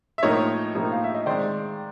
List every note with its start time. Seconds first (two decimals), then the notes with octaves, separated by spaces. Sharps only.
0.18 E5
0.23 A2 F3 A#3 D#4 C#5 D#5
0.75 A2 F3 A#3 D#4
0.92 F5
1.04 E5
1.15 D#5
1.26 D#3 G#3 C4 C5 D5